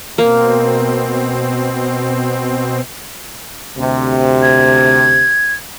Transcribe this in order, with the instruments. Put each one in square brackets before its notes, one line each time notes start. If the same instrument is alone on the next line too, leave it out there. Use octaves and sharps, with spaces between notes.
[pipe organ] B2 C4 [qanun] A#3
[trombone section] D2 C3
[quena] G#6